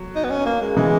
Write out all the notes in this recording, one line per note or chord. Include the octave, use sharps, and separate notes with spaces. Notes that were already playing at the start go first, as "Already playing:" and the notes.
Already playing: F#3
D#4
B3
C#4
A#3
G#3
C#3 E3 G#3